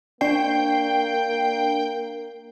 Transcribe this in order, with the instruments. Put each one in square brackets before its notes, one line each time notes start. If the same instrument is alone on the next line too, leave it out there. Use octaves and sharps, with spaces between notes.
[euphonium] A#3 [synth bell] D4 D5 C7 [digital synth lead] G5